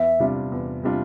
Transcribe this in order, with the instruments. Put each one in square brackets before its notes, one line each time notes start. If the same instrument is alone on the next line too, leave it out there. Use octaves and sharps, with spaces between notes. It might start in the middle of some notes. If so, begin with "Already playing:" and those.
Already playing: [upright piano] E2 [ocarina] E5
[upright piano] C3 G3 D4 F4
E2
C3 G3 D4 F4